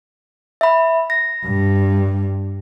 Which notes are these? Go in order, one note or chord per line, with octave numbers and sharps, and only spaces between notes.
E5 B5
A#6
G2